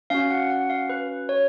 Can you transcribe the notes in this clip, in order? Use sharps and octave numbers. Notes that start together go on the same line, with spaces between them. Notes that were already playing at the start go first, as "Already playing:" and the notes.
C#4 F#4 F5
F#5
F#5
F5
B4
C#5